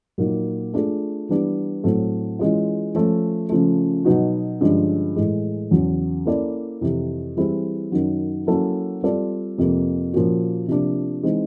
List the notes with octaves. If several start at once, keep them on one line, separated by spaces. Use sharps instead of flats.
A#2 F#3 A#3 D#4
A3 D4 F4 G#4
E3 G3 B3 D4
A2 F#3 A3 C4
E3 G#3 C#4 F4
F3 A3 C#4
C#3 F3 A3
B2 F#3 B3 D#4 F#4
G2 D3 F3 G#3 C#4
A2 E3 G#3
E2 C#3 F#3
A#3 C#4 E4 A4 D5
F2 C3 E3
E3 G3 C4 E4 G#4
F#2 D#3 F#3
F#3 A#3 C#4 E4 A4
G3 C4 F4 A4 D5
F2 C3 F3 A#3
A#2 F3 A#3 C#4 F#4
C3 F3 A#3 D4
E3 G#3 C4 D#4